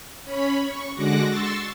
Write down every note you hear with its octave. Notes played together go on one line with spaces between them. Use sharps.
C#4 C#5 B5
C#6
D3 G#3 F#4 D6 F#6 A#6
C6 C#6 E6 A6